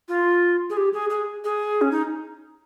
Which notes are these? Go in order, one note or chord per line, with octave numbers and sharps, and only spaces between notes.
F4
G#4
G4
G#4
G#4
G#4
C#4
D#4